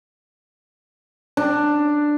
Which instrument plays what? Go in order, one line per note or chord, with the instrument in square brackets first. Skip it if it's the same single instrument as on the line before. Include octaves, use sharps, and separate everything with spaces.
[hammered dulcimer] D4